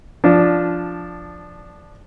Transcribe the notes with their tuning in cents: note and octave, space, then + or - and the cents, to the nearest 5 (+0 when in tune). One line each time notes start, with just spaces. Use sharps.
F3 +0 D4 +0